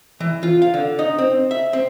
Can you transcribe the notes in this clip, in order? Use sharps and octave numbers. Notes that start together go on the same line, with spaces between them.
E3
F4
F5
D3
D#4
C4
E5
C4